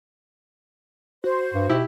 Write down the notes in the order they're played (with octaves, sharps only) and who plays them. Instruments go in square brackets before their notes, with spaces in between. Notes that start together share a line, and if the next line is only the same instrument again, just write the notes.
[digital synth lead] F#4 [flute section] C5
[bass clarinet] G2
[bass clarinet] B2 [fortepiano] E4 G4